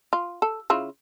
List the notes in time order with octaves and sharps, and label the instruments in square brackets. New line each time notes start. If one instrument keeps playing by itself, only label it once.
[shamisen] F4
A4
C#3 E4 F4